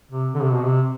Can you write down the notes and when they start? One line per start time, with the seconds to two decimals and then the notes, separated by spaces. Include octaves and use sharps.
0.11 C3
0.34 D3
0.41 C3
0.53 B2
0.65 C3